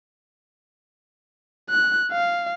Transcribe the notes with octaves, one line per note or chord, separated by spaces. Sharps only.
F#6
F5